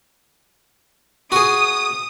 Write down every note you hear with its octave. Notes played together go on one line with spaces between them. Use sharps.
F#4 G#4 D#6